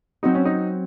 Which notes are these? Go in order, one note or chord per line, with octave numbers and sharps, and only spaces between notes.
F#3 C4 D#4 F#4
C#4
D#4